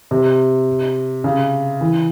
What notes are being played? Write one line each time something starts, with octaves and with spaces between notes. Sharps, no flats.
C3
C#3
E3